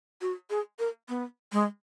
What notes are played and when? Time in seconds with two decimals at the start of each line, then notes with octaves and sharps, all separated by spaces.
0.21 F#4
0.50 G#4
0.79 A#4
1.09 B3
1.53 G#3